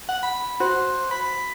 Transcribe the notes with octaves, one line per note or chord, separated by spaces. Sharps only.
F#5
B5
F#4 C5
B5